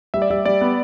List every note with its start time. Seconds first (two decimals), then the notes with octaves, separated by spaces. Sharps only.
0.14 G3 E5
0.22 D5
0.30 G3 E5
0.45 G3 D5
0.61 B3